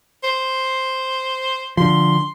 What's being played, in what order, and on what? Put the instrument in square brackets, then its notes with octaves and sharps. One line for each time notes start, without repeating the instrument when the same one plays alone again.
[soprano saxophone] C5
[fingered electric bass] D3 F3 [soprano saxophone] C6